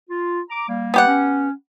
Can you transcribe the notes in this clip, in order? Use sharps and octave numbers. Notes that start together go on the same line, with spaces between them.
F4
A#5 D6
G3 A#3
B3 G4 F#5
C#4